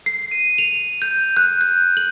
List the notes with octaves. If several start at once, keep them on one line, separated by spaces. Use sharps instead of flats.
C7
D#7
F7
G6
F#6
G6
F#7